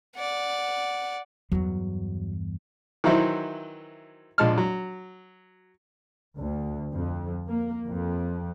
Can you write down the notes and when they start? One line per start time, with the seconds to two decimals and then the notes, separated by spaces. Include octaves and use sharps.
0.16 D5 F#5
1.52 E2 G2 F#3
3.04 D#3 E3 F#3 E4 C5
4.38 A#1 F3 G#3 A5 F6
4.58 F#3
6.37 D2
6.93 F2
7.49 A#3
7.88 F2